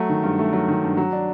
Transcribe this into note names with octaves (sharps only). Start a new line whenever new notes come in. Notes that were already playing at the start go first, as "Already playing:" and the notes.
Already playing: F#3 A3
D#3
G2
A3
F#3
D#3
G2
F#3
D4